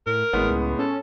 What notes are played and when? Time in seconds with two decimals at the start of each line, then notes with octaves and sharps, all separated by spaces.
0.06 A2 A#4
0.33 G#1 A2 G#3 B3
0.50 C#2
0.79 C#4 A4